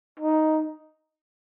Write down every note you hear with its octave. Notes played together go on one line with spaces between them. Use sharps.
D#4